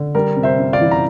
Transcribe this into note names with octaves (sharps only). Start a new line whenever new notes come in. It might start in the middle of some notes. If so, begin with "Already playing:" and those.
Already playing: D3
G3 A#4
C3
C5 E5
C3
D5 F5
E3
A#5